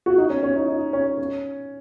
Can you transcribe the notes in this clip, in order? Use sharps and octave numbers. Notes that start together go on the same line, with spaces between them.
F#4
D#4
C#4
C#4
D#4
D#4
C#4
C#4